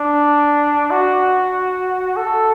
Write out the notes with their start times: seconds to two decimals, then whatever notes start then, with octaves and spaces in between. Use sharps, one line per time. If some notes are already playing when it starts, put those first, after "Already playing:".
Already playing: D4
0.91 F#4
2.16 A4